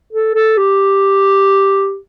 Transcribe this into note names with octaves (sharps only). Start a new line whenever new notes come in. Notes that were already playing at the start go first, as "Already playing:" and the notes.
A4
A4
G4